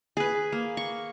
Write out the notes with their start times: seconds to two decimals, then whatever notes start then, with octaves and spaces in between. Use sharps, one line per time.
0.17 G#4 B4
0.52 A#3
0.77 C#6